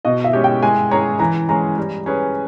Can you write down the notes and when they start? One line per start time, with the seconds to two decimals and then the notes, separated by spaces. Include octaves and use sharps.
0.05 B2 D#5
0.24 E5
0.33 G#3 C#4 G4
0.44 G5
0.63 G#3 G#5
0.91 C#4 G#4 C#5 A#5
1.19 E3 A#5
1.49 G#3 C#4 G#4 A#5
1.77 G3
2.06 C#4 G#4 B4